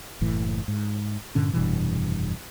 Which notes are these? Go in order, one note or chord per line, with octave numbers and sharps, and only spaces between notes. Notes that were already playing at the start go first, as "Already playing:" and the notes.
F#1 A2 E3
G#2
G2 A#2 D3 C#4
F1 G2 B2 E3